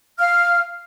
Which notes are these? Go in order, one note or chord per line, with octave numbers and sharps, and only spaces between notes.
F5 F6